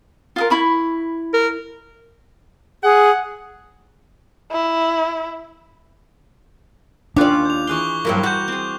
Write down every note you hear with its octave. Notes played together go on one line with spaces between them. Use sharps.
F4 G#4 A#4
E4 B5 C#6
A#4
G#4 F#5
E4
D#2 C#4 D4 F4 C#5 D5 D6 F#6
G6 F7
E3 G#4 C6 C#6 F#6 G7
G2 F#3 A#3 E4 A#4 C5
F#4 F#6 G6
C4 G#4